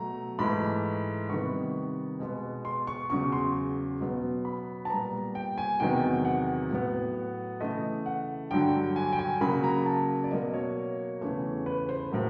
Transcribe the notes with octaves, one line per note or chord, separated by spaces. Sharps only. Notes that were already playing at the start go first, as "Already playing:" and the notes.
Already playing: B2 F#3 A3 A#5
G#2 E3 A3 B5
C3 D#3 G3 B3 C#6
B2 G#3 B3
C6
C#6
E2 C#3 F#3 C#6
C6
B2 F#3 B3
B5
A5
A#2 G3 B3 A#5
G5
G#5
E2 C3 D#3 F#3 B3 G5
F#5
A2 F#3 B3
C#3 E3 A3 D#5
F#5
G2 D3 F#3 G5
G#5
G5
G#5
C#3 F#3 A#3 B5
A#5
A5
D5
B2 F#3 A#3 D#5
C#5
E2 C#3 E3 A3
B4
C5
A2 F#3 A#3